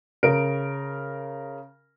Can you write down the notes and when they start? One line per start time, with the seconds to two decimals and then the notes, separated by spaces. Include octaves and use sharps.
0.23 C#3 A#4 D7